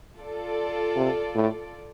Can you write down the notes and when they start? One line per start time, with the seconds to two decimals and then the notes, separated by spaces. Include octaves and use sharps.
0.18 F4 A4 D5
0.96 C3
1.35 A2